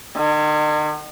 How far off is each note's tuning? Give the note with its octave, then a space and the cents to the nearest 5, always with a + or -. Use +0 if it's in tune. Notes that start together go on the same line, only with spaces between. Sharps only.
D#3 -45